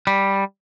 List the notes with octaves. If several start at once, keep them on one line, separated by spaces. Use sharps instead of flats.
G3